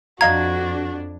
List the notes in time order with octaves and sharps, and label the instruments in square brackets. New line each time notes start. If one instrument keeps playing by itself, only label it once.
[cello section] F2 D4 [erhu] F#4 [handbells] D#5 F5 A#5 [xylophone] G#6